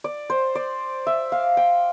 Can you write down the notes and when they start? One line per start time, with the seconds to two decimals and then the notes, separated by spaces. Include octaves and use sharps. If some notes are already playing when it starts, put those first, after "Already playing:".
0.04 D5
0.30 C5
0.55 D5
1.07 E5
1.32 F5
1.57 G5